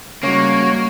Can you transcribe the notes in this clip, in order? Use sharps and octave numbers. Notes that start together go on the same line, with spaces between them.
C#3 G3 G#3 A#3 F#4 C#5